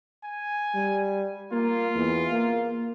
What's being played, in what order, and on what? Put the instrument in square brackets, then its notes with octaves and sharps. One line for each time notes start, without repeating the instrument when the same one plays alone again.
[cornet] G#5
[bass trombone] G3
[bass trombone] A#3 [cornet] F4
[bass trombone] E2
A#3